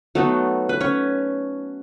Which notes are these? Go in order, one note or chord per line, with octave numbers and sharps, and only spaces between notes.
F#3 A3 B3 D#4 A4
B4
C#4 C#5